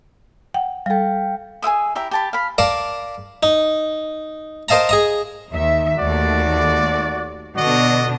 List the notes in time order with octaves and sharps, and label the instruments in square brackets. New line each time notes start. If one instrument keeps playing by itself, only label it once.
[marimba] F#5 G5
[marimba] G3 A4 [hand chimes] F5 G5
[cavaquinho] G#4 C5 E5 D#6
E4 G4 E5 A#5
G4 A5 B5
F5 B5
[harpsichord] A#4 D5 F5 A5
D#4
A#4 C5 D#5 F5 A5 A#5
G#4 D#5 A#5
[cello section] D#2 D#3 E5
[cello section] D#2 A3 [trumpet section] F#4 D5
[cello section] B2 D3 D4 [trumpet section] F#4 D5 D#5